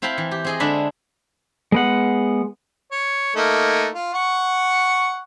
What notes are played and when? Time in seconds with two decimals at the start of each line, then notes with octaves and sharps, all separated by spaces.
0.02 C4 E4 F5 G5 A5 B5
0.18 E3
0.31 G4
0.44 C4 G#4 D#5
0.60 D3 G#3 D4 E5 B5
1.72 G#3 B3 F#5
2.92 C#5
3.36 A3 A#3 D#4
3.94 F4
4.14 F#5 C#6